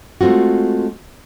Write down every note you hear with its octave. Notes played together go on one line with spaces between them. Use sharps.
G#3 A3 C4 F4 F#4